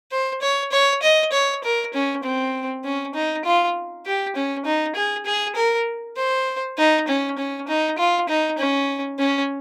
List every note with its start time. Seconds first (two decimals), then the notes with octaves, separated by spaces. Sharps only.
0.12 C5
0.42 C#5
0.72 C#5
1.02 D#5
1.32 C#5
1.64 A#4
1.94 C#4
2.24 C4
2.85 C#4
3.15 D#4
3.45 F4
4.06 G4
4.36 C#4
4.65 D#4
4.95 G#4
5.26 G#4
5.56 A#4
6.17 C5
6.78 D#4
7.08 C#4
7.38 C#4
7.68 D#4
7.98 F4
8.29 D#4
8.58 C#4
9.19 C#4